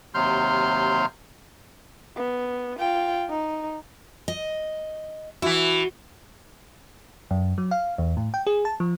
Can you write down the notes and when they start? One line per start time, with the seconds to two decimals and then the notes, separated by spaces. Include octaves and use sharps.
0.14 D#2 C3 F#3 C6 F6 G6
2.16 B3
2.79 F4 G5
3.29 D#4
4.28 D#5
5.42 E3 E4 F#4
7.31 F#2
7.58 F#3
7.71 F5
7.98 E2
8.17 A2
8.34 G5
8.47 G#4
8.65 A5
8.80 F3